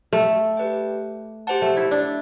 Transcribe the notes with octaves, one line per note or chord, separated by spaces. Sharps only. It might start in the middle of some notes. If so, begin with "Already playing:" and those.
A3
G4 B4 D5 G5
G4 C5 F#5 A5
A3
E4
D4